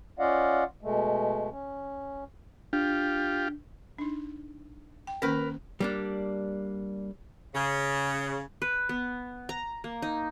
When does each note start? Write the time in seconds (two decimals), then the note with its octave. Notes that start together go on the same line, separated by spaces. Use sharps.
0.19 C#4 F4 D5 D#5 F5 F#5
0.83 B2 G#3 A3
1.51 C#4
2.73 D4 F4 G4
3.99 D4 D#4
5.07 G5
5.22 D#3 A#3 C#4 A#4 B4
5.80 G3 A#3 D4
7.55 C#3
8.62 B4
8.89 B3
9.49 A#5
9.84 A#3
10.02 D#4